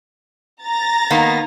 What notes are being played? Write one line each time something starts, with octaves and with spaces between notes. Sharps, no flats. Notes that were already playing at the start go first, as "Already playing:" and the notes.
A#5 A6 A#6
D#3 A#3 B3